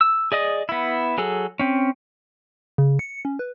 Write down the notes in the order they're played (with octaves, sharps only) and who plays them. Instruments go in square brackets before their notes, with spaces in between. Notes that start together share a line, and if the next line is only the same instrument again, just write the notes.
[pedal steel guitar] E6
G#4 D5 D#5 D#6
B3 E4
F#3 G#4 A4
C4 C#4
[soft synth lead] C#3
C#7
C#4
B4